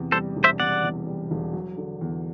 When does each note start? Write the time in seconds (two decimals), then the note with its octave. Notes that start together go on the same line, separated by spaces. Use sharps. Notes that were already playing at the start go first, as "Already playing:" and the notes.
Already playing: E2 C3
0.12 G3 A4 C5
0.36 E1
0.44 C5 E5
0.60 C3 D5 F#5
0.83 E2
1.06 G3
1.31 E1
1.53 F#3
1.77 D3
2.01 E2